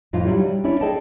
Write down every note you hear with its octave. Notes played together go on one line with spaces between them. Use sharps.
F2 A2 D#4 F4
F#3 G3 D4 E4
G3
C#4 D4 E4 C#5
G#4 A4 D5 D#5 G5 A5